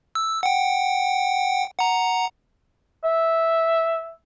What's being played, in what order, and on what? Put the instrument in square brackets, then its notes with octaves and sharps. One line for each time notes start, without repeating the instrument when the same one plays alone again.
[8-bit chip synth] E6
F#5 G5
F#5 A#5
[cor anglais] E5